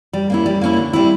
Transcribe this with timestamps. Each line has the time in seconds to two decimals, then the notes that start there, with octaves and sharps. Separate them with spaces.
0.13 G3
0.30 A#3 C#4 E4
0.46 G3
0.61 A#3 C#4 E4
0.77 D3
0.93 G3 C4 E4